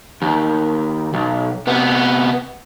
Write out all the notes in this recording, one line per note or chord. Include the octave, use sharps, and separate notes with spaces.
D#2
B1
C3 B3